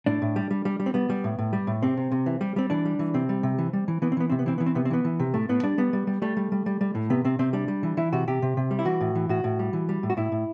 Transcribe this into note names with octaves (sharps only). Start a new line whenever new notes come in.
A2 D4
A2
G3
G3
G3
G3
C4
G3 B3
G3
A2
A2
G3
A2
C3 C4
C3
C3
E3
G3
G3 C4
E3 D4
G3
E3
C3 C4
G3
C3
E3
G3
E3
E3 B3
C4
E3 B3
C3 C4
B3
E3 C4
E3 B3
C4
C3 B3
C4
E3 B3
E3
C3
A2 A3
A2 B3
G3 D4
G3 B3
G3
G3
G3 A3
G3
G3
G3
G3
A2
C3 B3
C3 C4
C3 C4
G3 D4
G3
E3
E3 E4
C3 F#4
C3 G4
C3
C3
G3
E4
E3 F#4
A2
E3
A2 F#4
A2
G3
E3
G3
A2
F#4
A2 E4
A2